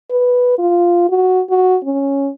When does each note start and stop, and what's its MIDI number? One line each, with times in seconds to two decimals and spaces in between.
0.10 0.55 71
0.58 1.07 65
1.09 1.42 66
1.50 1.77 66
1.84 2.30 61